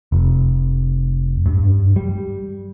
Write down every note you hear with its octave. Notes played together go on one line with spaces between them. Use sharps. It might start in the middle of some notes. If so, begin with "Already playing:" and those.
F1
G2
G3